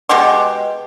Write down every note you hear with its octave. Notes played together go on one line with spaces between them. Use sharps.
B2 G#3 G4 C6